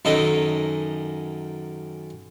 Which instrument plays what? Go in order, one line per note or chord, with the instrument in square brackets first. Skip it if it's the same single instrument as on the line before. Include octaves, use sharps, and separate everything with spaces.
[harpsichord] F#2 D#3 A4 D#5